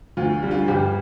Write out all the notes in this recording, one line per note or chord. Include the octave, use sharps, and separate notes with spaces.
D2 F4
D3 G3
F4
G1 G3 G4